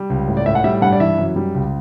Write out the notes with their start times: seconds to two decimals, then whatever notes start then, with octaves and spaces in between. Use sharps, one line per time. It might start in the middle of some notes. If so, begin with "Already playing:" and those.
Already playing: G3
0.10 C#2
0.28 A2
0.37 D5
0.46 A2 E5
0.55 F#5
0.64 G3 E5
0.82 G2 F#5
0.92 D5
1.00 E3 E5
1.18 F#2
1.36 G3
1.54 C#2